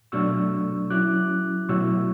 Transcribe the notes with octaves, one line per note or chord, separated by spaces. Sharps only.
B2 F#3 A3 D4 C#6 E6
F#3 C#4 E4 D6 F#6
B2 F#3 A3 E4 C#6 E6